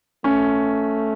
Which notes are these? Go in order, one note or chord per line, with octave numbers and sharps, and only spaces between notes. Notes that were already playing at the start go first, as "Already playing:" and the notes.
A3 C#4